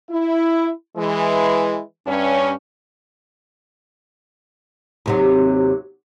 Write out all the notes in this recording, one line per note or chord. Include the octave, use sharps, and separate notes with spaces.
E4
E3 G#3
G2 C#4
D#2 C3 F#3